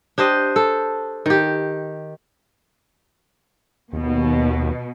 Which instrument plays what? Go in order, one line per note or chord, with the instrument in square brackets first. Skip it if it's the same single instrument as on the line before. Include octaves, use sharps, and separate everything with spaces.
[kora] D4 G4 C5 D#5
A4
D#3 G4
[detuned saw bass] D#2 [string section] B2